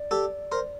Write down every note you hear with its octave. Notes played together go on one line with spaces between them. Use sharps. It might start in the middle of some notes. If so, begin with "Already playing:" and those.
Already playing: D5
G4 A4
A#4 C5